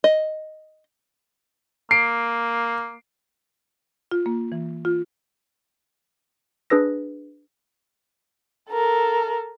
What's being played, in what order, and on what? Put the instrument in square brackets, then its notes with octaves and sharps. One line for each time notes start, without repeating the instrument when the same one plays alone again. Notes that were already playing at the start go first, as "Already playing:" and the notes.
[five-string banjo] D#5
[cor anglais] A#3 [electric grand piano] C7 D7
[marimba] F4
A#3
E3
F4
[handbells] D4 G#4 B4 E6 A#6
[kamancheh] A4 A#4